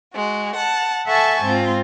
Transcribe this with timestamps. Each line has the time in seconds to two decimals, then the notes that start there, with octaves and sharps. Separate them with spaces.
0.14 G#3 F#4
0.56 F#5 A5
1.06 A4 E5 F#5 G#5 A5 C#6
1.43 G#2 C4 F4